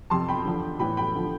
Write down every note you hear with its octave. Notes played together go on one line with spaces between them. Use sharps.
F2 C3 F3 A5 C6
G5 B5
E2 D3 F3
A2 E3 G5 B5
G5 B5
D3 F3